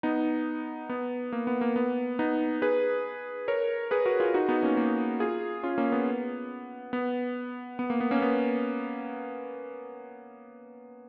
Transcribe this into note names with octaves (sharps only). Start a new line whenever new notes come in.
B3 D#4
B3
A#3
B3
A#3
B3
B3 D#4
G#4 B4
A#4 C#5
G#4 B4
F#4 A#4
F4 G#4
D#4 F#4
B3 D#4
A#3 C#4
A#3
F4 G#4
C#4 F4
A#3 C#4
B3
B3
B3
A#3
B3
A#3 C#4
B3